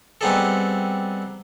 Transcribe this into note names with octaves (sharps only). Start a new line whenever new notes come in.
G3 B3 C4 D#4 G#4 A4